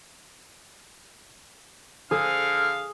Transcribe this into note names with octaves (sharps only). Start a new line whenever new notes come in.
D3 G#4 F5 F6